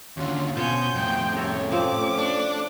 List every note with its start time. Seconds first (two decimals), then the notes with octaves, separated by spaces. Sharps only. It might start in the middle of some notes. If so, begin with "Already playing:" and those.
0.17 D#2 D3 C#4 F4
0.57 B2 C#4 F4 C5 C#5 G#5 G6
0.95 F2 A2 G5 C6
1.37 A3 C#4 G4 A4 A#4 C#5
1.72 F3 C4 D6
2.18 D4